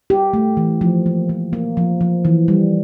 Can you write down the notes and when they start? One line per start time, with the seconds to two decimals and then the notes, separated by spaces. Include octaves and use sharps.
0.10 G4
0.33 A3
0.57 E3
0.81 F3
1.06 A#3
1.29 F3
1.53 A#3
1.77 F3
2.01 F3
2.25 E3
2.48 G3